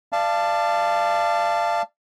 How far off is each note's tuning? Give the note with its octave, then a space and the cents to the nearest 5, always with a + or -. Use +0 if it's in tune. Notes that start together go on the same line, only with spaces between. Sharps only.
D5 +20 F5 -25 A5 +0